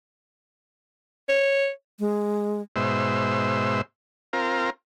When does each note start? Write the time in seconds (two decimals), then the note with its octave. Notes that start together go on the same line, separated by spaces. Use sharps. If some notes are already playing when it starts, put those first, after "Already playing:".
1.29 C#5
2.00 G#3
2.76 G#2 B2 C5 E5
4.33 C4 F4 A#4